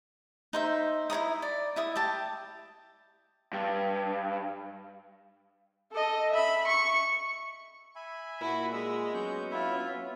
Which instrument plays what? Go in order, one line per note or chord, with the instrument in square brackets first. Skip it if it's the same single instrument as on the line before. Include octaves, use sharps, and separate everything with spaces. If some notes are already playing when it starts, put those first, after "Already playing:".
[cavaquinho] D#4 C5 E5
E4 C#5 A#5 D#6
D5
E4 E5 D#6
G4 A5
[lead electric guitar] G2
[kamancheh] A4 D#5
E5 B5
C#6
[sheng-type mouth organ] E5 G#5 B5
[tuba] A#2 [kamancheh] E4 F#4
[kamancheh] G#3 [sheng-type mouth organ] E5 E6
[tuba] F#3 [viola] B3 C#4 [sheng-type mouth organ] C#6 G6
[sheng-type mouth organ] E4 E5 [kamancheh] F4